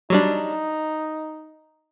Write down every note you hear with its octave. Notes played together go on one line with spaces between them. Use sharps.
F#3 G3 D4 D#4